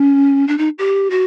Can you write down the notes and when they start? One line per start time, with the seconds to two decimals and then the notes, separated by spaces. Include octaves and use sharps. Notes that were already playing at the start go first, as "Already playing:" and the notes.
Already playing: C#4
0.48 D4
0.58 D#4
0.79 G4
1.10 F#4